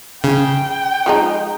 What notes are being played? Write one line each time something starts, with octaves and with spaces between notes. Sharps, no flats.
C#3 G5
F3 G#3 D#4